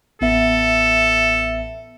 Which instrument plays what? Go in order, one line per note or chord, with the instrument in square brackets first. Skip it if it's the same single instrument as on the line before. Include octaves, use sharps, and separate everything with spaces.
[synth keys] A1 B3 E5 [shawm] A4